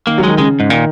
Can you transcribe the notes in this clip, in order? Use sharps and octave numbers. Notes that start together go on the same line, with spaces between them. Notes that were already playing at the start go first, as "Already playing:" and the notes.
D#3 A#3
F#3
D#3 G#3
C#3 G#3
G#2
A#2 D#3